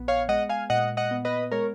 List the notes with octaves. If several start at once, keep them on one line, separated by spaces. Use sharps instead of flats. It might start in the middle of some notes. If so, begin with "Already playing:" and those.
Already playing: A#1 B3
C#5 F5
G#3 D#5 F#5
F5 G#5
A#2 D#5 F#5
D#5 F#5
B3
B4 D#5
G#3 A#4 C#5